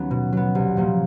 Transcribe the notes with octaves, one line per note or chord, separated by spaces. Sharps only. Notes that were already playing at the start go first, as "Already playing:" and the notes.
Already playing: D#2 D#3 F#3 B3 C#4 F#4
B2
F#3 B3
C2
A#2 F3 A#3 C#4